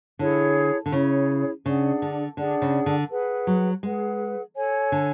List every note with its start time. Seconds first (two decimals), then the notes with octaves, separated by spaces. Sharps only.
0.19 D3 E4 G#4 C#5
0.86 D3
0.92 C#3 E4 G#4 C#5
1.65 C#3 D4 G#4 D5 F#5
2.02 D3
2.37 D3 D4 G#4 D5 F#5
2.62 C#3
2.86 D3
3.10 G#4 B4 F#5
3.47 F#3
3.83 G#3 G#4 B4 F#5
4.56 A4 C#5 G#5
4.92 D3